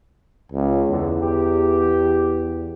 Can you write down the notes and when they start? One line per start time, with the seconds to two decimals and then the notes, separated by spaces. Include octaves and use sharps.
0.52 C#2
0.90 E2 G#2 D3
1.21 G4